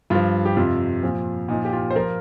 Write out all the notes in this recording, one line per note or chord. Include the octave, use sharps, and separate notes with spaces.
G2 F3 F4
G4
F2 C3 F3 F4
A#2 F3
A#2 F3 D#4
G4
F4
C5
F3 F4 A#4